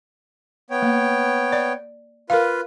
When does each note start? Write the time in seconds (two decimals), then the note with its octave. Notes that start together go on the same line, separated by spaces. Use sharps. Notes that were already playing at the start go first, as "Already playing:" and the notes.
0.70 B3 C#5 G5
0.82 A#3
1.52 D5
2.30 F4 A#4 B4 F5